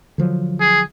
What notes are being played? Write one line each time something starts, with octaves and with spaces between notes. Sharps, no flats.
D3 F3 F#3
G#4